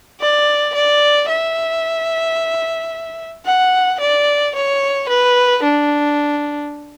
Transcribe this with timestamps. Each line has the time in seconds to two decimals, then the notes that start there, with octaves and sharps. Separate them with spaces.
0.20 D5
0.74 D5
1.28 E5
3.45 F#5
4.00 D5
4.55 C#5
5.08 B4
5.63 D4